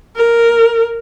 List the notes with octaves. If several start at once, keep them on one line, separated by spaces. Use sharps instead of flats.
A#4